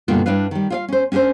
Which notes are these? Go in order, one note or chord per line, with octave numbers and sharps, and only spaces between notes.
G2 B2 D3 A#3 B3 F4
G2 D4 E4 B4 F5
D#3 G3
F4 D5 F5
C#4 C5
C#4 D4 F#4 A#4 C5